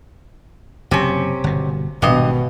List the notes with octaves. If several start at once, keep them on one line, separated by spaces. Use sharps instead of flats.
F#1 F#2 C3 C#4
G1 B2
G#1 G2 B2 D#5